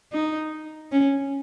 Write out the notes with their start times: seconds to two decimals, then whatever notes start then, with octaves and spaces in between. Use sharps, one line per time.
0.12 D#4
0.92 C#4